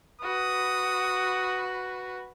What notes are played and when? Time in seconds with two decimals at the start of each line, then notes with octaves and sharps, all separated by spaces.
0.22 F#4 B4 D#6